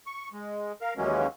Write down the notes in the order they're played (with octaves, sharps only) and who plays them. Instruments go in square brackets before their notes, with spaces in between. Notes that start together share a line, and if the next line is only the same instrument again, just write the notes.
[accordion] C#6
G#3
A#4 F5
D#2 E3 F#3 G#3 A#3 C#4